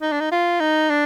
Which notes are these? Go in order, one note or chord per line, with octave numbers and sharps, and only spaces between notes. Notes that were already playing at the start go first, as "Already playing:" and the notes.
D#4
D4
D#4
F4
D#4
D4